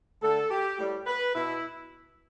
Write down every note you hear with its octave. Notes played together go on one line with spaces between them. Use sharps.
D3 A3 A4
G4
A2 G3
B4
B2 E4